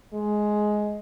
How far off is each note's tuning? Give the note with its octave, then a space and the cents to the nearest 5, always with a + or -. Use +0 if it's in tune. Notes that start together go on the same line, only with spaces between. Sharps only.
G#3 +10